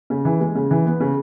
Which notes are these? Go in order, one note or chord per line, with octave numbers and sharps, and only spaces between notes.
C#3
E3
G#3
C#3
E3
B3
C#3